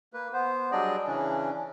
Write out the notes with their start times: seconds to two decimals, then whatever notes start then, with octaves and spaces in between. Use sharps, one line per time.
0.13 A#3 B4
0.33 B3 C5
0.72 F#3 G3 D4 G#4 D5 D#5
1.07 C#3 E3 C#4 D4